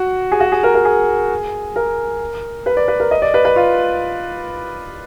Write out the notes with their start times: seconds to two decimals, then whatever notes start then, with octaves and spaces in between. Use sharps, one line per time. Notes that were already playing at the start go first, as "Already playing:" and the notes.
Already playing: F#4
0.32 G#4
0.40 F#4
0.52 G#4
0.63 A#4
0.74 A#4
0.85 G#4
1.76 A#4
2.66 B4
2.77 D5
2.88 B4
3.00 A#4
3.11 D#5
3.22 D5
3.34 B4
3.45 B4
3.56 F4